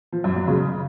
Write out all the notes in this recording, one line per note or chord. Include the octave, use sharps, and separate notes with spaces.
F3
F#2
F#3
C#3